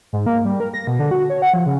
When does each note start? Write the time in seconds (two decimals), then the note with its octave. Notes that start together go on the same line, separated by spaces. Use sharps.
0.13 G#2
0.26 A#3
0.45 G3
0.60 A#4
0.74 A#6
0.87 B2
0.99 D3
1.11 F#4
1.30 C#5
1.42 F#5
1.54 F3
1.66 C#3